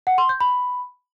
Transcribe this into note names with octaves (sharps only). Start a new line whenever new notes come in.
F#5
C6
G6
B5